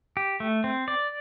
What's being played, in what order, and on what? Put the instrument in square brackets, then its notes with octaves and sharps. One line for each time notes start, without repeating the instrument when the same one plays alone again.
[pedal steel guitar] G4
A3
C4
D5